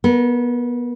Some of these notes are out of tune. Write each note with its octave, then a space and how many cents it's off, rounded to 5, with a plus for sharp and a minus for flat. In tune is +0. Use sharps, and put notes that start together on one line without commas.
B3 -25 A#4 +0